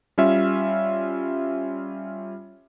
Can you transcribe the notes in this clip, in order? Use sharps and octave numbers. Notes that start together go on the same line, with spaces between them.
G3 C#4 F4 E5